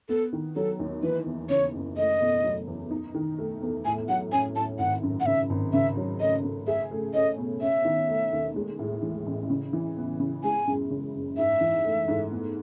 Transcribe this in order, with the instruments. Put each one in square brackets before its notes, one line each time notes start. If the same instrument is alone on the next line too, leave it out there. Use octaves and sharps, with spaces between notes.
[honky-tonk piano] B3 [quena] A4
[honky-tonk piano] D#3
[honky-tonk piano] F#3 [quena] A4
[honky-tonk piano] D#2
[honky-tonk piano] E3 [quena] B4
[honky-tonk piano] E2
[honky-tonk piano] C#3 [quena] C#5
[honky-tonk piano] F#1
[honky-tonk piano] A3 [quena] D#5
[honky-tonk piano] B2
F#3
E2
D#4
D#3
A3
E2
[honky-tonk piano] A2 [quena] G#5
[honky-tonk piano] F#3 [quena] F#5
[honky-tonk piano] C#4 [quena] G#5
[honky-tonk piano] A2 [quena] A5
[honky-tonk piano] G#1 [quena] F#5
[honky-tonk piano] F#2
[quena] F#5
[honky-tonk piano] C#3 [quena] E5
[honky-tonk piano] G#1
[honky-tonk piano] C#3 [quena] E5
[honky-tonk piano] F#3
[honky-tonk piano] A3 [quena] D#5
[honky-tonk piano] C#3
[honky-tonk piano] G#4 [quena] E5
[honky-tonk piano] A3
[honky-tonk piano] C#4 [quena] D#5
[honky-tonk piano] B2
[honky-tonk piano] C#4 [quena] E5
[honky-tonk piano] D#3
A3
D#2
G#3
A2
E3
A1
C#3
E3
B3
C#3
[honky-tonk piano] G#3 [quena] G#5
[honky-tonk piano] F#2
C#3
F#1
[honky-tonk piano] G#2 [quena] E5
[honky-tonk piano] E3
A3
G#2
B3